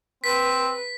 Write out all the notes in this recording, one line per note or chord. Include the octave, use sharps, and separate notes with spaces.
C4 B4 B6